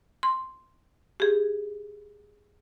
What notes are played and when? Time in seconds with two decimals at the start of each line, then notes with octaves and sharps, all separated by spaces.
0.23 C6
1.20 G4 G#4